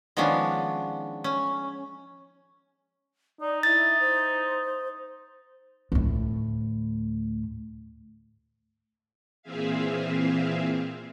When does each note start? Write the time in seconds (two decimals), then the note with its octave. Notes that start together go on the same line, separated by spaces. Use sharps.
0.17 D#3 F3 G#3 B3 C#4 D4
1.24 C#4
3.41 D#4 D5
3.63 E4 A6
4.00 C5
5.92 D2 A2
9.43 A#2 E3 C4 G#4 E5 F5